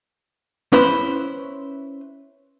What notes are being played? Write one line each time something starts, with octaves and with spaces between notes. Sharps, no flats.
C#4 E4 B4 C5